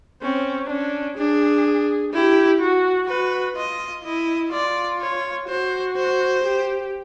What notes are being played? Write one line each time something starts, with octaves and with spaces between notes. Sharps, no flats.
C4 C#4
C#4 D4
D4 G#4
E4 G4
F#4
F#4 B4
F4 D#5
E4 D#5
F4 D5
C#5
F#4 C5
C5
G4